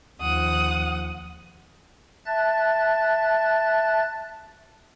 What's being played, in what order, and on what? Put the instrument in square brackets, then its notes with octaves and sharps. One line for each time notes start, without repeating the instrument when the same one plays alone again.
[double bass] D#2 F3 [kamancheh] F#5 D#6
[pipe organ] E5 A5 F#6 A6